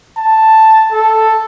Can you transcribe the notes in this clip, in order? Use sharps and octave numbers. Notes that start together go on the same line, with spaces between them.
A5
A4